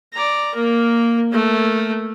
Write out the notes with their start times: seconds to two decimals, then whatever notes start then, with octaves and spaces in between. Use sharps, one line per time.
0.13 D5 A#5
0.54 A#3 A#4
1.32 A3 A#4